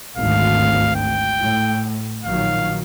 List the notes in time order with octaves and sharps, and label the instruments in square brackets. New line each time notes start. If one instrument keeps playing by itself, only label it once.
[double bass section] G#1 D2 [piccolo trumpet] F5
[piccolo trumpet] G5
[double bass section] A2
[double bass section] A#1 D#3 F#3 [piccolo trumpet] F5